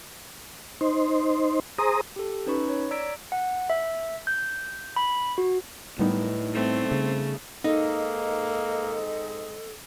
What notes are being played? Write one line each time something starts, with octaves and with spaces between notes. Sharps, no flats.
D#4 C5
G#4 C5 A#5 D#6
G4 A4
C#4 D#4 B4 B5 C#6
C#5
D5 A#5 E6 G#6 B6 D7
F#5
E5
G6
B5
F#4
A2 G3 B3 D#4
A3 C4
C#3
G#2 A#3 C4 D#4 A4 D#5